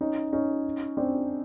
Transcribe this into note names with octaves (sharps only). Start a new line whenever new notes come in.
C#4 D#4
C#4 D#4
C4 D4